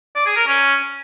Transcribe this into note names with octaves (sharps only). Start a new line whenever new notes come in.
D5
G#4
A#4
C#4